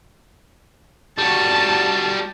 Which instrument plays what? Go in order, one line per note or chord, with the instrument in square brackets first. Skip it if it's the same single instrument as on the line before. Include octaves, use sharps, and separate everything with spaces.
[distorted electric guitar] G3 F#4 [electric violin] A5